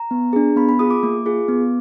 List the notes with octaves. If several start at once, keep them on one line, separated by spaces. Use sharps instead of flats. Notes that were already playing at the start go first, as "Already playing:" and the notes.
Already playing: A#5
B3
D4 G#4
B3 B5
B5
F4 G#4 D#6
D6
A#3
F4 G#4
B3